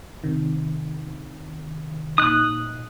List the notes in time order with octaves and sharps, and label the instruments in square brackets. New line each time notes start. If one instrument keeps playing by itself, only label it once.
[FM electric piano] C3 D#3
[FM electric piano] A#2 D#4 [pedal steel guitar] D#6 F#6